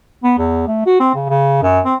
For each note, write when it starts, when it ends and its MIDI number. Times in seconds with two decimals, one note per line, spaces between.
0.24 0.35 59
0.38 0.66 40
0.67 0.84 57
0.86 1.00 66
1.00 1.10 60
1.15 1.26 49
1.29 1.59 49
1.63 1.80 42
1.85 1.94 60